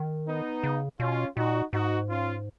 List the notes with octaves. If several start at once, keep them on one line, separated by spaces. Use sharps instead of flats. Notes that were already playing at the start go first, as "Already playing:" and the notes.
Already playing: D#3
B3 D#4
C#3
B2 C#4 F4
A#2 D#4 F#4
G#2 D#4 F#4
C#4 F4